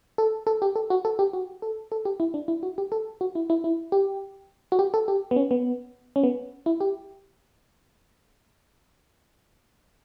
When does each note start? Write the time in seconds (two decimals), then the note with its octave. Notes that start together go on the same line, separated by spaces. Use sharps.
0.18 A4
0.47 A4
0.62 G4
0.76 A4
0.90 F#4
1.05 A4
1.19 G4
1.33 F#4
1.62 A4
1.92 A4
2.05 G4
2.20 E4
2.34 D4
2.48 E4
2.63 F#4
2.78 G4
2.92 A4
3.21 F#4
3.35 E4
3.50 E4
3.64 E4
3.92 G4
4.72 F#4
4.79 G4
4.94 A4
5.08 G4
5.31 B3
5.36 C#4
5.51 B3
6.16 C#4
6.23 B3
6.66 E4
6.81 G4